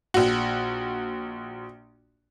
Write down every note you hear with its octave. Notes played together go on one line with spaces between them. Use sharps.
A#1 F#4